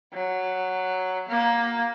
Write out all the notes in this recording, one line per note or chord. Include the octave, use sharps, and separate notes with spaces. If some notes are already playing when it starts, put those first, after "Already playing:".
F#3
A#3